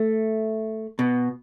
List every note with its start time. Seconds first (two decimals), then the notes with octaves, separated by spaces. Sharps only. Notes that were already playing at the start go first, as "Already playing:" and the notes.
Already playing: A3
0.99 B2